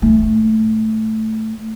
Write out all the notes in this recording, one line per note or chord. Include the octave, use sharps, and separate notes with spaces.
A2 A3